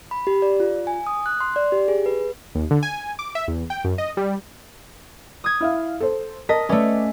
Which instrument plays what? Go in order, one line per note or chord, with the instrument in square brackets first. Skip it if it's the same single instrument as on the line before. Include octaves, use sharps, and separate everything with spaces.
[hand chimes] B5
G4
D5
F4
G#5
D#6
F#6
C6
D5
G4
G#4
B4
[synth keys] D#2
D3
G#5
D6
E5
E2
G5
F#2
D#5
G3
[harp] D#6 G#6
[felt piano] E4 E5 F5
A4 C5
[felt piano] A#4 A5 B6 [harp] D#5
[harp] A3 C#4 [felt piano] B4 D5 E5